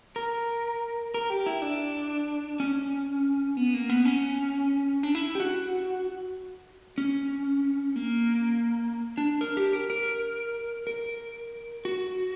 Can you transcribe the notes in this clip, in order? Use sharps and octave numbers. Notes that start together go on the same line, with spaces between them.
A#4
A#4
G4
E4
D4
C#4
B3
A#3
B3
C#4
D4
E4
G4
F#4
C#4
A#3
D4
A#4
G4
A#4
A#4
A#4
F#4